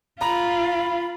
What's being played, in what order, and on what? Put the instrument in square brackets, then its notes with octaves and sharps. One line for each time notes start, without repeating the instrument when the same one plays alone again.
[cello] F4 [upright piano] A#5 [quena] B5